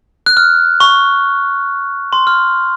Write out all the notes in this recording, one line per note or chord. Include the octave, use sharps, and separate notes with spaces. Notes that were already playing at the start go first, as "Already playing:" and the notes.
F#6
F6
C#6
C6
F6